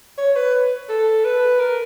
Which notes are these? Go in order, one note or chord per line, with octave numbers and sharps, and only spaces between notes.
C#5
B4
A4
B4
A#4